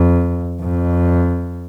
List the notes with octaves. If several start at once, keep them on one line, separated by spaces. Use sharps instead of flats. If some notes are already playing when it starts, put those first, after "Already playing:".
Already playing: F2
F2